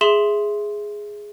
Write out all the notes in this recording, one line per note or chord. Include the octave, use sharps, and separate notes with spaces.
G#4 E5 C6 E7 F#7